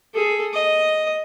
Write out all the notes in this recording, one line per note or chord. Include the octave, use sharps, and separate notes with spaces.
G#4 A4
D#5